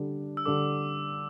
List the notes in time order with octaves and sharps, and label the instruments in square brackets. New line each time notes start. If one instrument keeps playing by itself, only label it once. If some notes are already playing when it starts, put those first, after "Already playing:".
Already playing: [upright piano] D3 G3 D4 A4
[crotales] E6
[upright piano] D3 G3 D4 A4 [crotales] D6